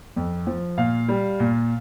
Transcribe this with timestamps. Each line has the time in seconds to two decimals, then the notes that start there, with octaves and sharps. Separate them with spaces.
0.16 F2
0.47 F3
0.78 A#2 F5
1.08 G3
1.40 A#2